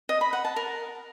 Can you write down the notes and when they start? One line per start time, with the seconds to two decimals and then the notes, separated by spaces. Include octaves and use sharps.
0.09 D#5
0.21 B5
0.33 F#5
0.45 A5
0.56 A#4